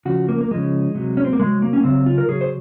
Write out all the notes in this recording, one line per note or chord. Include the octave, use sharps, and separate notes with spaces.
C#3 F3 F#4
A#3
A#3
C#3 F3 G#3
C3 F#3
C#4
C4
A#3
C3 F#3 G#3
A#3
C#4
C#3 F#3 C4
F4
A#4
C#3 F#3 G#4
C5